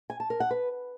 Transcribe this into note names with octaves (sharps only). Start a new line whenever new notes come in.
G#5
A5
A#4
F#5
B4